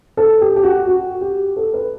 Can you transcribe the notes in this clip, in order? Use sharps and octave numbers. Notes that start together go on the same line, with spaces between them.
A4
G4
G4
F#4
F#4
G4
A4
B4